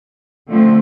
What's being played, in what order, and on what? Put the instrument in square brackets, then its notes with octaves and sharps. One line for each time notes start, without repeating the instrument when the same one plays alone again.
[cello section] D3 F3 A3 C4